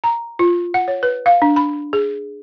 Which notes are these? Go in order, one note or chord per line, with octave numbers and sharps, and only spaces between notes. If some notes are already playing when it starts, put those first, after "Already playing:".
A#5
F4
F#5
C#5
B4
F5
D4
B5
G#4